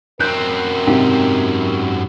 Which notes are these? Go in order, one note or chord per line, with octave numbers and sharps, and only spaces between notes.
F#2 C4 A#4 F#6 G6
G#2 C3 D#4 G4